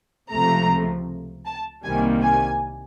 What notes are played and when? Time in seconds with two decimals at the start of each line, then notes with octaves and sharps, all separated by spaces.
0.32 C#2 C3 F3 A3 A#5
1.46 A5
1.84 C2 C3 D#3 G3 A#3 G#5
2.23 G#5